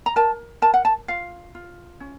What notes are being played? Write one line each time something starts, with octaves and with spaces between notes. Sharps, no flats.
A#5
A#4 A5
A#4 A5
F#5
A5
F4 F5
F4
C#4